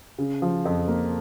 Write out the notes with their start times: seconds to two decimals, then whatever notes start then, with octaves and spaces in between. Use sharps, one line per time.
0.18 C#3
0.42 F3
0.65 F2
0.88 A#3